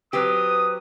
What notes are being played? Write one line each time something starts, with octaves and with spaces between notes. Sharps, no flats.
F#3 C4 G4 B4 D#6